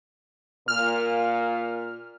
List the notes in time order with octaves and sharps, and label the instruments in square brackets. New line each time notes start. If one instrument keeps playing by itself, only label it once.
[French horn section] A#2 [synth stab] F6